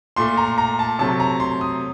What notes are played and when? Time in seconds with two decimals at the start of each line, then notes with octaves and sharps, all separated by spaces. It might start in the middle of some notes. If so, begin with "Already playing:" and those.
0.16 A#2 A3 C6
0.37 A#5
0.58 A#5
0.79 A5
0.99 C3 F#3 A3 A5
1.20 A#5
1.40 C6
1.61 D#6